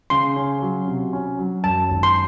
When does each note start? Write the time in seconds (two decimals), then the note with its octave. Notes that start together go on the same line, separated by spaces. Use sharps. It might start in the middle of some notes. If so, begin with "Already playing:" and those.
0.10 C#3 C6
0.36 C#4
0.62 F#3
0.88 C3
1.13 C#4
1.39 F#3
1.64 F#2 A5
1.91 G#1
2.03 C6